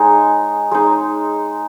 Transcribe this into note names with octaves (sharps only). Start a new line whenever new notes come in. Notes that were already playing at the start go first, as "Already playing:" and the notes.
Already playing: G#3 D#4 G#5
G#3 D#4